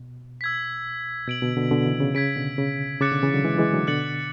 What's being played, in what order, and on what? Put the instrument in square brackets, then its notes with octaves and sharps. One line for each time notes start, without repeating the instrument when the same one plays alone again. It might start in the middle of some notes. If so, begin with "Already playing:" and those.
Already playing: [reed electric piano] B2
[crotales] E6 G#6 B6
[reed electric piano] B2 [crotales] G#6 D7 F#7
[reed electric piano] B2 D3
B2 D3
B2 D3
C#3 E3
C#3
[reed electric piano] C#3 [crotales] G#6 B6 D7
[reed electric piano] B2 D3
C#3
[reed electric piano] C#3 [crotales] D6 F#6 A6 C#7
[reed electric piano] B2 D3
C#3 E3
D3 F#3
E3 G#3
E3 G#3
D3 F#3
[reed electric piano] B2 D3 [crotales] F#6 A6 C#7 F#7